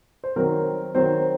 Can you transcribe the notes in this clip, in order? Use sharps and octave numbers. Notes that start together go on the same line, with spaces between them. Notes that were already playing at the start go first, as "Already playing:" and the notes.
C5
D#3 F#3 C4 A#4
D#3 F#3 C4 C5